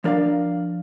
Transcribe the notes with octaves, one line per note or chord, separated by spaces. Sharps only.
F3 D4 A#4 D5 F5